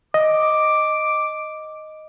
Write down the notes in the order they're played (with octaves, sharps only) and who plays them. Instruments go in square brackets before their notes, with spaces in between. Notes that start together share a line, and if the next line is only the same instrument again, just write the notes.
[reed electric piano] D#5 [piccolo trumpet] D6